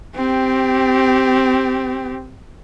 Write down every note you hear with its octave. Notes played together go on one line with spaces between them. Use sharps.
C4 G4